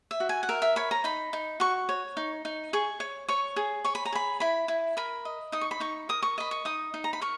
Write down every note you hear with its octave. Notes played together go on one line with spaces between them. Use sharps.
E5
F#4
G#5
F#5
A#4 E5
E5
C#5 B5
A#5
D#4 B5
D#4
F#4 C#6
C#5
D#4
D#4
G#4 C#6
C#5
C#5 C#6
G#4
C#5 C#6
B5
A#5
G#4 B5
E4 B5
E4
A#4 B5
D#5
D#4 D#6
C#6
B5
D#4 C#6
A#4 D#6
C#6
D#5 B5
C#6
D#4 D#6
D#4
A#5
B5
A#4 C#6